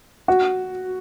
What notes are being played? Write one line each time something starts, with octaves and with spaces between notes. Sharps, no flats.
F#4